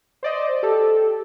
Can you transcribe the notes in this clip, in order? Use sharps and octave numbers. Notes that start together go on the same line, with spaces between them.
C5 D5 D#5
G4 A4